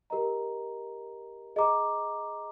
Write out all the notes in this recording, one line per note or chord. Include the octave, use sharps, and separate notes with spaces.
G4 A#4 D#5 A#5
G#4 D#5 A#5 D6